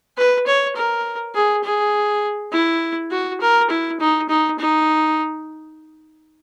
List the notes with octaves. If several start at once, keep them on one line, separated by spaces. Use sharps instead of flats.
B4
C#5
A#4
G#4
G#4
E4
F#4
A#4
E4
D#4
D#4
D#4